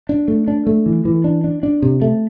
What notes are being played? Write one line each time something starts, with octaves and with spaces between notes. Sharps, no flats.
D4
A3
D4
A3
E3
E3
D4
D4
D4
C3
A3